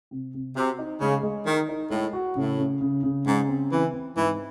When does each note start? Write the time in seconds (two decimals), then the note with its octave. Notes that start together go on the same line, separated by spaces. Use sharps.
0.11 C3
0.34 C3
0.55 C3 F#4
0.79 D#4
1.01 C#3 G#3
1.23 G#3
1.46 D#3 D#4
1.69 D#4
1.90 A2 G#3
2.13 F#4
2.35 A2 C#3
2.58 C#3
2.81 C#3
3.03 C#3
3.26 G#2 C#3
3.49 C4
3.71 E3 C4
3.93 C4
4.16 G#2 E3